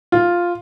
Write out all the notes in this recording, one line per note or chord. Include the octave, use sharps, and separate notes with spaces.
F4